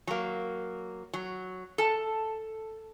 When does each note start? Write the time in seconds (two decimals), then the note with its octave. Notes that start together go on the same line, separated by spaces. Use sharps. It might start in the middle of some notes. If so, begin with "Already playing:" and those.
0.07 F#3 A#3
1.13 F#3
1.78 A4 A5